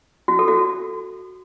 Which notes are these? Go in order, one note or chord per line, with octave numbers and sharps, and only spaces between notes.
F#4
A4
F#4